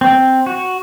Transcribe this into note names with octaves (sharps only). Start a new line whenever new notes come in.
C4
F#4